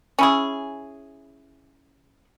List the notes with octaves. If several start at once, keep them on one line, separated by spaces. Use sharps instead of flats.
C#4 E4 G#4